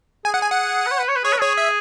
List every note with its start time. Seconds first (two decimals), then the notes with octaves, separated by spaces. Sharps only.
0.25 G#4 G#5
0.34 F#5
0.42 G#5
0.51 F#5
0.86 B4
0.91 C#5
1.00 B4
1.08 C#5
1.16 B4
1.24 G#4 C#5
1.33 B4
1.40 G#4 C#5
1.58 E5